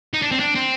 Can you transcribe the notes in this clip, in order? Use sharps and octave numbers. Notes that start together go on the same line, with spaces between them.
D#4
D4
C4
D4
C4